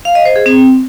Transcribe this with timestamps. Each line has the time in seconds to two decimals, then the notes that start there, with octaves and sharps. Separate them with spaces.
0.05 F5
0.15 D#5
0.26 C5
0.36 G#4
0.46 C4